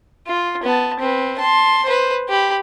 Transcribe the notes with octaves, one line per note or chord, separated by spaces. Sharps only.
F4
B3 A5
C4 B4
A5 C6
B4 C5
G4 B5